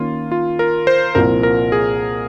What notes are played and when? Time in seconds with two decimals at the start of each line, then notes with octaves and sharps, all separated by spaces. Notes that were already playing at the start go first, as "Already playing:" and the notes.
Already playing: D#3 A#3 C#4 F4
0.31 F4
0.59 A#4
0.87 C5
1.15 C2 A#2 F3 C4 A#4
1.43 A#4
1.72 G#4